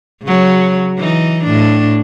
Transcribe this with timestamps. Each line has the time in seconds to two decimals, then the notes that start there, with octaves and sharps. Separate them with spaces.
0.23 C#3 F#3
0.98 E3 D#4
1.44 A2 D4